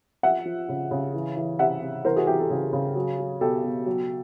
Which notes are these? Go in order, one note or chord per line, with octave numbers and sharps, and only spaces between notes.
F3 E5 F#5
F3
C#3
C#3
E3
E3
C3 E5 F#5
C3
E3 A#4 C5
F#4 G#4
E3 G4
G4 A4
C#3 F#4 G#4
C#3
F#3
F#3
B2 G4 A4
B2
F#3